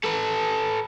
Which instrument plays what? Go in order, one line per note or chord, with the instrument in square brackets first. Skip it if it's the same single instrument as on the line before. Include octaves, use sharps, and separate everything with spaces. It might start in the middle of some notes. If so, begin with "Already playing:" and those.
[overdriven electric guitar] A4 B4